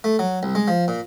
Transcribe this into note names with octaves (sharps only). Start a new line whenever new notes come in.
A3
F#3
C2
G#3
F3
A#2